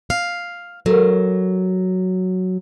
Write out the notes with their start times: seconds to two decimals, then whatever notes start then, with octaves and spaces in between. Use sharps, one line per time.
0.10 F5
0.86 F#3 A4 A#4